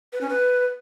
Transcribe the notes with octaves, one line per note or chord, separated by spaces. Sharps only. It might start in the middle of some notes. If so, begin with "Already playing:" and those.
B4
C#4
B4